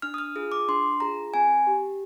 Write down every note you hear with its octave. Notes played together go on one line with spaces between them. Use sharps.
D4 F6
D#6
F6
F4 G#4 D#6
D6
D4 C6
F4 G#4 A#5
C4 G#5
G4